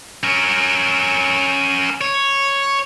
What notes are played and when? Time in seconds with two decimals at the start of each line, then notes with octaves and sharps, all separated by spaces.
0.23 C#4 A#4
2.01 C#5